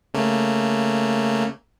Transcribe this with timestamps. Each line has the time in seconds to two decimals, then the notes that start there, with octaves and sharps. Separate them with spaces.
0.14 C#3 A3 A#3